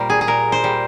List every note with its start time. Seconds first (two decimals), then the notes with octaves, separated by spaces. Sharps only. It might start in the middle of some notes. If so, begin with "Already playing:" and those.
Already playing: A#2 G3 A#4 C5
0.10 G#4
0.21 G#4
0.27 A#2 A#4
0.52 C5
0.64 G3